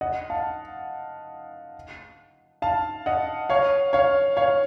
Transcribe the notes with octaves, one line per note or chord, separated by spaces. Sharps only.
D#5 F#5
F5 A5
F5 A5
D#5 F#5
C#5 F5
C#5 F5
C#5 F5